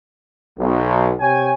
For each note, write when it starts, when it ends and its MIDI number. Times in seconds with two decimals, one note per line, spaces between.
0.59 1.12 35
1.20 1.51 48
1.20 1.51 73
1.20 1.51 79
1.20 1.51 80